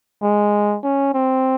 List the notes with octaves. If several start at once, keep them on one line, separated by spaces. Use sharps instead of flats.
G#3
C#4
C4